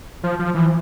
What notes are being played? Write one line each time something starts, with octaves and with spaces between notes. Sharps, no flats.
F3
F3
E3